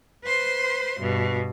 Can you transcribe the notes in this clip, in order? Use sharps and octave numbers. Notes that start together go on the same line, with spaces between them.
B4 C5 C6
G2 B2